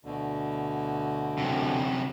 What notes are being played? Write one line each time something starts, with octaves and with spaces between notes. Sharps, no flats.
D2 B2 D3
F#2 C3